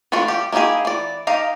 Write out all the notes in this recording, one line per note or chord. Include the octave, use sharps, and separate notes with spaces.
E3 A3 D4 F4 F#4
G3 G4
A#3 D#4 E4 G4 G#4
E3 D5
D#4 G4 F5 A#5